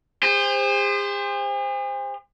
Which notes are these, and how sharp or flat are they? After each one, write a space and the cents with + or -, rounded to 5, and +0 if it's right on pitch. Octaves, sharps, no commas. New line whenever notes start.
G#4 -45 C5 +0